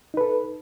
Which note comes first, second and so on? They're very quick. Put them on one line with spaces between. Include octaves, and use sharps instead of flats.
D#4 B4 A4